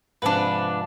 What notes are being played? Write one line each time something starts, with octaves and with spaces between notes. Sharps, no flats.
G#2 C3 F3 D4 B4